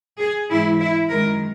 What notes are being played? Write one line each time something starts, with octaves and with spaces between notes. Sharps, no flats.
G#4
G#2 E3 G#3 E4
E4
F#2 D#3 G#3 A#4